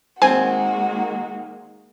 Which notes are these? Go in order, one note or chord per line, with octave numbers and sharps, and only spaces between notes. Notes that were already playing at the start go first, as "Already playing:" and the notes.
D#3 G#3 A#3 C4 F#4 G#5